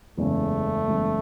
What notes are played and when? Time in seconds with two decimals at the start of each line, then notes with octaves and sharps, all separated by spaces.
0.17 F#1 E2 C#3 G#3 A3
0.88 F#1 E2 C#3 G#3